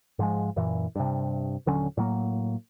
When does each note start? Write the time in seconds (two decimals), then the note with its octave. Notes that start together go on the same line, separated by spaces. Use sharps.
0.19 G#2 F3 G#3
0.56 F#2 A#2 E3
0.96 G2 C3
1.66 D#1 D3 F#3 C#4
1.97 A2 F#3 A#3